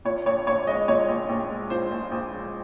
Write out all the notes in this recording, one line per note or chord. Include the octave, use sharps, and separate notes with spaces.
A#2 C#5
A#1 C#5
A#1 C#5
G#3 D#5
A#2 C#5
A#1
A#1
G#3
A#2 C5
A#1
A#1
G#3